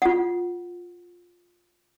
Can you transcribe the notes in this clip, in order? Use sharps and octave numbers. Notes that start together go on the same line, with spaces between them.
F4 F#5